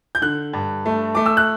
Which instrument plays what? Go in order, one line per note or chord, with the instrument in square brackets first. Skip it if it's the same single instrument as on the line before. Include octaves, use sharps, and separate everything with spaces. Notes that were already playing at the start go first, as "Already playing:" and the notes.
[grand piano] G6
D3 F#6
G2
A3
A3 D6
E6
F#6